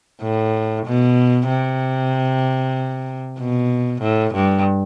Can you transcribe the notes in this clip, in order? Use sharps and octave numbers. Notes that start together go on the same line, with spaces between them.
A2
B2
C3
B2
A2
G2